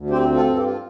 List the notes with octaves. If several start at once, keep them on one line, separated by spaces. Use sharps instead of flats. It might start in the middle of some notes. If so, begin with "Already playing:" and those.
Already playing: D2
C4 G4 C5
C4
F4 A4
G2
A4
G4
F4